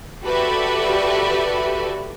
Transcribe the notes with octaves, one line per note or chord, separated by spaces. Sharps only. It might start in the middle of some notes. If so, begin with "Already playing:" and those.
F#4 G4 A4 B4 D5 E5